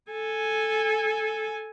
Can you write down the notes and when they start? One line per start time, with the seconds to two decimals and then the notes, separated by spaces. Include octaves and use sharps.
0.12 A4 G#5